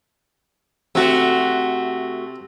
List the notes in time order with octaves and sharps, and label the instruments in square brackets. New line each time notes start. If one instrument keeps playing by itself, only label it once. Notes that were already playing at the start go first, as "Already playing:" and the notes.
[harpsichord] C3 [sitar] A3 F#4